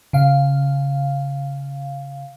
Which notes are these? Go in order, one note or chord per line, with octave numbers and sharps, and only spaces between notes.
C#3 F5